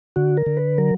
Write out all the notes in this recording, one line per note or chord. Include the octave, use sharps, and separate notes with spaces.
D3 F#4
A#4
D3
B4
F#3 A#4